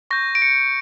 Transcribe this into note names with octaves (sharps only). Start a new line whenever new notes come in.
C#6 G6 A#6
D7
C#7